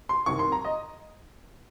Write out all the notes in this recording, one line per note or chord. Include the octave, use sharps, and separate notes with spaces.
C6
C2 C3 D#3 C#6
C6
A#5
D#5